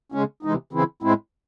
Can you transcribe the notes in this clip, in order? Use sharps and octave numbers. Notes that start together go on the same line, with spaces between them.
C#3 G#3 C#4
C3 E3 G#3 D#4
C#3 E3 C4 E4
A2 G#3 C4 E4